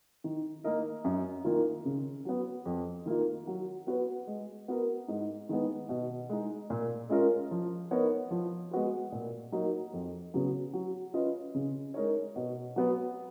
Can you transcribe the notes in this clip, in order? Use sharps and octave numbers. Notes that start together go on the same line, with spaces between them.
D#3
A#3 D#4 A#4 D#5
F#2
D#3 A#3 F4
C#3
F#3 B3
F2
D#3 A#3 F4
F#3
B3 F#4 B4
G#3
B3 F#4 A#4
G#2
D#3 G#3 B3
B2
G#3 D#4
A#2
G#3 C#4 F4 A#4
F3
B3 D#4 A#4 C#5
F3
G#3 B3 F#4 B4
A#2
F#3 A#3 D#4
F2
C#3 F#3 B3
F#3
C#4 F4 B4 D#5
C#3
G#3 D#4 A#4 C#5
B2
F#3 B3